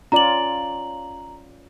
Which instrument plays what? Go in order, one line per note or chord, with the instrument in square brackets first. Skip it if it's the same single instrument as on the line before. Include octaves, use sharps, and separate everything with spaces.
[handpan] C#4 F4 D5 [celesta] A#5 F#7